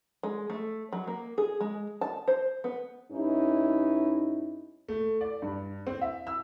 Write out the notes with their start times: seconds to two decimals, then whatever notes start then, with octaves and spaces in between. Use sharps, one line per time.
0.23 G#3
0.50 A3
0.93 F#3
1.07 A#3
1.38 G#4
1.61 G#3
2.01 A5
2.28 C5
2.64 B3
3.12 G2 C#4 D#4 E4
4.89 A3
5.21 D5
5.42 G2
5.87 C4
6.01 E5
6.27 E6